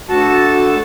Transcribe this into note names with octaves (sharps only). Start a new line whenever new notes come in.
D2 F#4 A4 A5